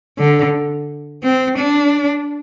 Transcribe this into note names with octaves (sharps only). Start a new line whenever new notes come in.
D3
C4
D4